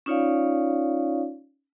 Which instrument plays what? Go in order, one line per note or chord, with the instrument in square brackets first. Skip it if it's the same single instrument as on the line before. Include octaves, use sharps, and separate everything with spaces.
[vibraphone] C#4 D#4 F4 C#5 D5 F5